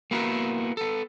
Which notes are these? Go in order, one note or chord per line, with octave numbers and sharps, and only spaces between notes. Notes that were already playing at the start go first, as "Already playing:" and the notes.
A#3 B3 E4 F#4 A#4
B3 A4